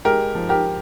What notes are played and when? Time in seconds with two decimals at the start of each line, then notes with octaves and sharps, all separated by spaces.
0.05 G#3 G4 A#4
0.35 F3
0.49 G4 A#4